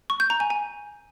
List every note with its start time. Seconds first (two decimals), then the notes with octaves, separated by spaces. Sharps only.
0.10 C#6
0.20 G6
0.30 A#5
0.40 G#5
0.50 G#5